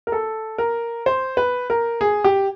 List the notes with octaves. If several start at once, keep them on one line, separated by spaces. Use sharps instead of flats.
A#4
A4
A#4
C5
B4
A#4
G#4
G4